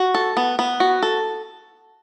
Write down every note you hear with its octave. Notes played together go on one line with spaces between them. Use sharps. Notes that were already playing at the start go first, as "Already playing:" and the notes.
Already playing: F#4
A4
B3
B3
F#4
A4